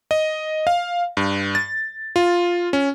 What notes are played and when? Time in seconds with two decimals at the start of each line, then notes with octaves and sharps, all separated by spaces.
0.11 D#5
0.67 F5
1.17 G2
1.55 A6
2.16 F4
2.73 C#4